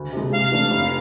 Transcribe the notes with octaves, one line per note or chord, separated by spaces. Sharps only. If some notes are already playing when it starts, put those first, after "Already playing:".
Already playing: D2
C3 G#3
C3 F5
E3 A3 D4
F1